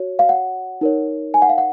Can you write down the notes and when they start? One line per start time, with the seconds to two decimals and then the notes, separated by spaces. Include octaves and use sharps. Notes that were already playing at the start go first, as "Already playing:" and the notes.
Already playing: F#4 C#5
0.19 F5
0.29 F#5
0.81 D#4 A#4 C#5
1.34 G#5
1.42 F#5
1.49 F5
1.58 F#5